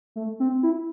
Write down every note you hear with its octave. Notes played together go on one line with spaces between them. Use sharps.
A3
C4
E4